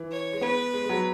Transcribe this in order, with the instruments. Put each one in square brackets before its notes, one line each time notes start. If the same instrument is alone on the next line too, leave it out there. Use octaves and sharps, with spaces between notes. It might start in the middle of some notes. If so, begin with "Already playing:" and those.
Already playing: [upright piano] E3
[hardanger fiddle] C#5
[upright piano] G#3
[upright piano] B3 [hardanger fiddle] B4
[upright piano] G#3
G#3
F#3